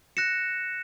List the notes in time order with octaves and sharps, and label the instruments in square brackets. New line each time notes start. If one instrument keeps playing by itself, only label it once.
[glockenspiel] F#6 A#6 C#7 E7